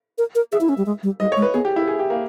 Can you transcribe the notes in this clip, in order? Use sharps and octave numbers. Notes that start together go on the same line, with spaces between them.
A#4
A#4
G#4 E5
E4
C#4
G3
G#3
G3
G3 D#5
C#5
G#3
B4
B3 G#4
G4
E4
G#4
G4
A#3